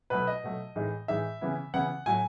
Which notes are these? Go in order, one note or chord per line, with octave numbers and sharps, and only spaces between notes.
B2 F#3 A3 B4
D#5
B2 F#3 A3
A2 E3 G#3 D#4
A2 E3 G#3 D#4 E5
C#3 E3 B3 E4
C#3 E3 B3 E4 F#5
A2 F#3 A3 E4 G#5